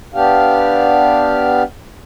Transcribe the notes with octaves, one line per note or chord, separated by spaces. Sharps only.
B3 D4 G4 F5